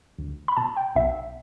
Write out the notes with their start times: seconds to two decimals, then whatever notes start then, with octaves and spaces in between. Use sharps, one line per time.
0.18 D2
0.48 B5
0.57 B2 A5
0.77 G5
0.95 B1 E5